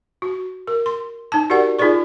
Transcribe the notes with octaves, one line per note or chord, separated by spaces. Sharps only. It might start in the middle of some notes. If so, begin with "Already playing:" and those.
F#4
A#4
C6
D#4 A5
F#4 G4 A#4 D5 F#5
D#4 F4 G#4 B4 D5 C#6